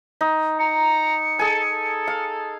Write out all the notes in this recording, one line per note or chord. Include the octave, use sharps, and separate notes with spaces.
D#4
A#5 C#7
G#4 A4 G#5
A4
F5